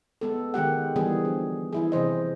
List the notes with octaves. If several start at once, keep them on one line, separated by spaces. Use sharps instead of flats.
G#3 B3 A4
D#3 G#3 G4 F#5
D3 E3 G3 B3 G#4
F3
E3 E4 G#4
C3 E3 C5 D#5